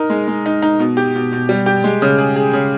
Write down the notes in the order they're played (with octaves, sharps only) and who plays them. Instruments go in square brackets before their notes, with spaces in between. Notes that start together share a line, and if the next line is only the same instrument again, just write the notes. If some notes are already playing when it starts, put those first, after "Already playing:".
Already playing: [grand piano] D#4 A#4
G#3
G#3
D#4
D#4
B2
G4
B2
B2
G3
G4
G#3
C#3
G#4
G#4
C#3